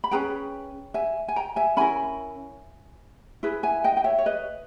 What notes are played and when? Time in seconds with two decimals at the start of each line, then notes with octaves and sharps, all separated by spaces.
0.04 B5
0.11 C#4 G#4 B4 G5 A#5
0.94 E5 G#5
1.28 G#5
1.36 G5 A#5
1.56 E5 G#5
1.77 C#4 E4 A#4 G#5 B5
3.43 E4 G#4 B4
3.63 E5 G#5
3.84 D#5 G5
3.97 G5
4.04 C#5 E5
4.18 C#5
4.26 B4 D#5